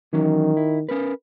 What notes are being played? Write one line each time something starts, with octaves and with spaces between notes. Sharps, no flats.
D#3 E3 F#3 C#4
E4
C#4 A#4 B4